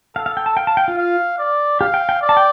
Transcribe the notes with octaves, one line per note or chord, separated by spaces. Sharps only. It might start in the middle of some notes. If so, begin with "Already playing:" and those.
A4 F5
F5
G5
A5
F5 G5
A5
G5
F4
F5
D5
G4 F5
G5
G5
D5
A5
G5